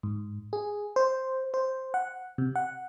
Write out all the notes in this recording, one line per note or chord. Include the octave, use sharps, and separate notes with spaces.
G#2
G#4
C5
C5
F#5
C3
F#5